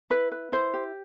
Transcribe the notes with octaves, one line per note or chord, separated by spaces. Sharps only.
E4 B4
B4
E4 C5
G4